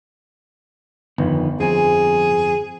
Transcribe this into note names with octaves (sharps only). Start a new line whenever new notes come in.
G1 F2 D#3 B3
F2 C4 G#4 G#5